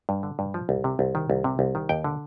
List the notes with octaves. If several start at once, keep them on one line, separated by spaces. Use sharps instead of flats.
G2
D3
G2
F3
C2
C3
C2
D#3
C2
C3
C2
D#3
D#2 G5
D3